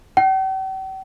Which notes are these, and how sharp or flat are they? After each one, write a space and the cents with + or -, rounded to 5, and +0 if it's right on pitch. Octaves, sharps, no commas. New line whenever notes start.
G5 -45